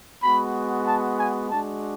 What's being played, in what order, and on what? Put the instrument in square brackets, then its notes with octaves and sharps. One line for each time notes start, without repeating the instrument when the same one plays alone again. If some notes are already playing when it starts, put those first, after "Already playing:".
[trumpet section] G#3 B3 F#4 B5
A5
G#5
G#3 D4 F#4 A5